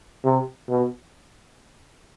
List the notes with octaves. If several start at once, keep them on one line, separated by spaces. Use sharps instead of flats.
C3
B2